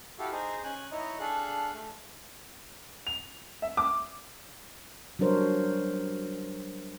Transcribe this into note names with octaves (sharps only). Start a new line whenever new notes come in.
E4 F#4 G4 A4 F5
D#4 G#4 C5
C#4 G#5 F#6
D#4 E4 C#5 D#5
D4 G#4 A4 F5 F#6
A3
F7
E5
D6
F#3 G3 D4 A#4 C5 C#5